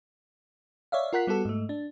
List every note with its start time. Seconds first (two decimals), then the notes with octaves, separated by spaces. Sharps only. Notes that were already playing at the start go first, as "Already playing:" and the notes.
0.92 C#5 D5 E5 F5
1.13 F4 A#4 F#5 F#6 B6
1.27 G3 B3 F#4 A4
1.45 G#2 A3
1.69 D4